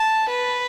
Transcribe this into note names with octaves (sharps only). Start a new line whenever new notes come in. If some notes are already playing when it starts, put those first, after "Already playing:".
Already playing: A5
B4